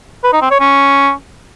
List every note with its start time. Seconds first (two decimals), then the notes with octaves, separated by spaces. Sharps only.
0.24 B4
0.33 D#4
0.42 C4
0.51 C#5
0.60 C#4